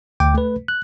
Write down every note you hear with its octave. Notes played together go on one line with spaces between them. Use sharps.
D2 G5 D6
A3 B4
F#6